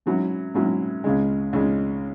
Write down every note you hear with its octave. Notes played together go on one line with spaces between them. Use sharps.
G#2 F#3 C#4 E4
G#2 F#3 C#4 E4
C#2 C#3 G#3
C#2 C#3 G#3